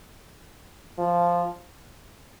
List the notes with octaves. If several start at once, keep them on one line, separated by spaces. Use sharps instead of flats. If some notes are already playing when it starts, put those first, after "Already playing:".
F3